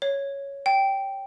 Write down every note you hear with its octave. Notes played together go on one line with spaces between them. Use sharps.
C#5
G5